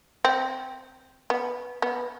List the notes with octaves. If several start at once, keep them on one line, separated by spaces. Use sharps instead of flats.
C4
B3
B3